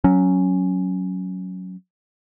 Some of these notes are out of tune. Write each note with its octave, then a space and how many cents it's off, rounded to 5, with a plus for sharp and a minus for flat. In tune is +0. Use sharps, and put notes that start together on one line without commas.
F#3 +0 C#4 +0